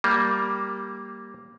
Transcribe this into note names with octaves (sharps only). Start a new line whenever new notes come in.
G3 A#3